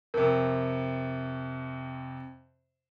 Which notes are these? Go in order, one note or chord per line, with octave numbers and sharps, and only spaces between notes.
F2 C3 A#4